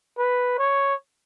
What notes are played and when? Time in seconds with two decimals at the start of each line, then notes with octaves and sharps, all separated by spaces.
0.18 B4
0.58 C#5